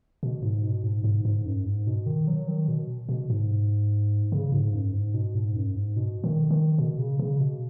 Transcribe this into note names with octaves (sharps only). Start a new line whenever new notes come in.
B2
G#2
B2
G#2
G#2
G#2
F#2
G#2
B2
D#3
F#3
D#3
B2
B2
G#2
C#3
G#2
F#2
G#2
B2
G#2
F#2
G#2
B2
D#3
D#3
B2
C#3
C#3
B2